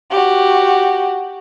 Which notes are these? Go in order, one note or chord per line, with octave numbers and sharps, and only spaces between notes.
F#4 G4